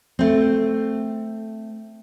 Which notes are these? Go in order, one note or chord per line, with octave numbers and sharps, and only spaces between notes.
A3 C4